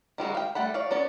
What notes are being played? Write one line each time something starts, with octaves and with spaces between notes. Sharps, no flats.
D#3 G3 G#3 F#4
F5 G5
G3 A3 F#5 B5
C#5 D5 F5
B3 C#4 D5